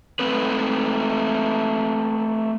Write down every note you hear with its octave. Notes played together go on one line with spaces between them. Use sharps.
A3 C4 B4